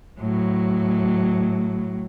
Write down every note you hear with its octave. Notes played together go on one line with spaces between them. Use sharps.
A2 F#3